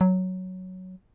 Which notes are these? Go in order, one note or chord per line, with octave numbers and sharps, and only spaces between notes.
F#3